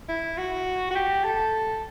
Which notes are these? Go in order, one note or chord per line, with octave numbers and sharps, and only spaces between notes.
E4
F#4
F#4
G4
A4